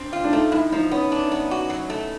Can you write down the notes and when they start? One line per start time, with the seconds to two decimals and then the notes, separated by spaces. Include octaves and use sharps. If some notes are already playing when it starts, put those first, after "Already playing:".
Already playing: C4 D4
0.13 F4
0.24 D4
0.32 A3 D#4
0.52 A2 E4
0.72 F3 D#4
0.91 B3 C#4
1.12 D4
1.32 B3
1.51 F#4
1.70 F#3
1.90 A3